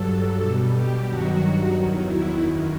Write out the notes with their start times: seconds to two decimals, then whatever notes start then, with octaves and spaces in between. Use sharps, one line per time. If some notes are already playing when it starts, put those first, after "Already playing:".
Already playing: G2 F#3 A4
0.39 B2 G3 A4
0.72 G4
1.05 G2 D#3 F#3 F#4
1.72 E2 D#3 F#3
2.06 E4
2.40 F#2 D#3 F#3